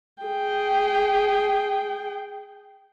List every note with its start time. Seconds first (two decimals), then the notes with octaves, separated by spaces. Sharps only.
0.23 G#4 G5